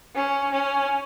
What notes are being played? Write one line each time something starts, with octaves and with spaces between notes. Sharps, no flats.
C#4
C#4